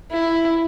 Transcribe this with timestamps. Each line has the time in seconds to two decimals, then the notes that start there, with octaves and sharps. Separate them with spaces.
0.12 E4